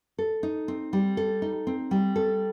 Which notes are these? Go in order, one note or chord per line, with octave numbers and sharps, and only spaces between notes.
A4
D#4
C4
G3
A4
D#4
C4
G3
A4